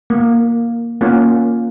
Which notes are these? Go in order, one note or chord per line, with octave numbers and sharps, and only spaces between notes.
A#3
A#3 C#4 F4